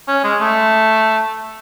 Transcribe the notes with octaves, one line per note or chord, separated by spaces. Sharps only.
C#4
G#3
A3